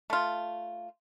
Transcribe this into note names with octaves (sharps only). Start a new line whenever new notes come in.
A3 F4